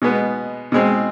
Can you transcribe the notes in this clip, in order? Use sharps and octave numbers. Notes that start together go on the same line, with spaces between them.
B2 G#3 B3
B2 G#3 C4